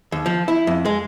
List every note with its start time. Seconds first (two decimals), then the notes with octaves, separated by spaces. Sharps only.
0.12 D#2
0.26 F3
0.48 E4
0.67 F2
0.85 G#3